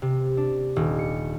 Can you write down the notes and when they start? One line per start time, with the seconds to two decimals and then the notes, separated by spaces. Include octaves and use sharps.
0.02 C3
0.37 D4
0.76 D#1
0.99 C#7